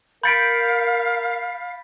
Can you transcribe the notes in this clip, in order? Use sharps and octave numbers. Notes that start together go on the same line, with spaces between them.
A#4 F5 B5 G6 A6 B6 C#7 D7